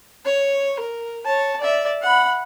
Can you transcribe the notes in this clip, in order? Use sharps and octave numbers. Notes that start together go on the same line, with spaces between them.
C#5
A#4
C#5 A5
D5 E5
F#5 B5